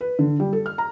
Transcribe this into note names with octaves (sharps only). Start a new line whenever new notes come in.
B4
D3
G3
A4
F6
A#5